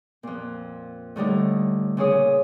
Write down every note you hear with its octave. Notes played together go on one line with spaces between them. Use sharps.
F2 A#2
A2 D3 G3 D#4
A#2 C#3 G#4 C#5 D#6